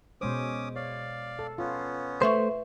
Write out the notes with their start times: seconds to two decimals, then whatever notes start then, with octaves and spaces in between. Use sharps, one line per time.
0.21 B2 G#3 C#4 C5 D6 D#6
0.76 C#5 D5 F5
1.39 A4
1.58 B3 C#4 F4
2.22 A3 B4 C5 E5 C#6